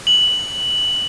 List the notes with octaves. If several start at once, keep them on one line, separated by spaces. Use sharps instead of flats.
F#7